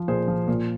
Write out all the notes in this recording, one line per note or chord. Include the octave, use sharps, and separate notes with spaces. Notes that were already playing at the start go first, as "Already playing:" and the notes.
Already playing: F3
A#2 G#4 C5
F3
A#2